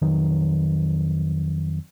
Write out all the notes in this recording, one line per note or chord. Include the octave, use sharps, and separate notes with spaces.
F2 D#3 F#3